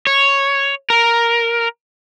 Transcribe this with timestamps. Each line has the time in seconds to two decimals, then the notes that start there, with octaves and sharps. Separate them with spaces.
0.07 C#5
0.90 A#4